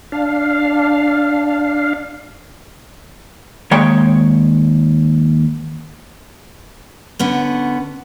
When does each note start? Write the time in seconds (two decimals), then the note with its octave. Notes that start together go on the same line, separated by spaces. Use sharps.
0.12 D4 F5
3.71 D#2 G#3 C#5 G5
7.19 D3 B3 C#4